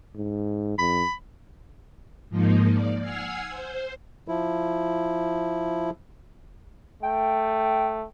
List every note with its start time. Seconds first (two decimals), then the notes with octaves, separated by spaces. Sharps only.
0.16 G#2
0.79 F2 B5
2.29 G#2 F3 A#3 D#4
2.71 D5
3.01 F#5 G#5 E6 F6 G#6 C7
3.50 C5
4.28 F3 E4
7.03 A3 G5